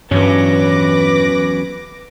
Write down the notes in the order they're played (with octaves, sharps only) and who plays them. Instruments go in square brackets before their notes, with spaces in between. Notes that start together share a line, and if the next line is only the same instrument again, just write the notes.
[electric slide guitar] E2 F#3 C#4 [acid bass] G2 [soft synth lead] E3 [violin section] B4 D6 A#6